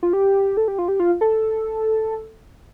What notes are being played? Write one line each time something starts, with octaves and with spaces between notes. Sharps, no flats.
F4
G4
A4
G4
F4
G4
F4
A4